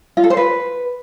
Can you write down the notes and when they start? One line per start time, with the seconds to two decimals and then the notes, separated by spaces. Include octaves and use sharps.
0.17 F4
0.24 A4
0.30 C5
0.37 B4